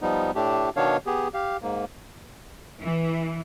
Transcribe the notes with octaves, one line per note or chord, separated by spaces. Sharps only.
F3 G3 B3 D#4
A2 A3 D4 G4
B2 D#3 B3 D4 C#5 F5
B3 G4 G#4
G4 F5
G#2 A#3
E3